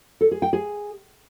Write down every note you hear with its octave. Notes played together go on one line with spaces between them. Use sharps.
A4
G#4
G5
G#4